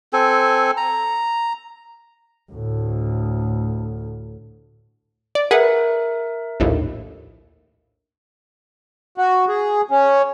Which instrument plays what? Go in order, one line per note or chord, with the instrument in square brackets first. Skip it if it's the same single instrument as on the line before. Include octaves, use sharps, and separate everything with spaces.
[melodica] C4 A4 G#5
A#5
[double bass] D2 A2
[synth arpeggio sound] D5
[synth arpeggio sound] G#4 B4 F#5 [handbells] A#4 E5
[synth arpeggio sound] A#1 D#2 A2
[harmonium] F#4
G#4
C#4